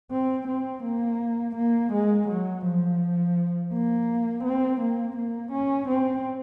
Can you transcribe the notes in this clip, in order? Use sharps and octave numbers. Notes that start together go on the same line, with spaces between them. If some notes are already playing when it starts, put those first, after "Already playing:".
C4
C4
A#3
A#3
G#3
F#3
F3
A#3
C4
A#3
A#3
C#4
C4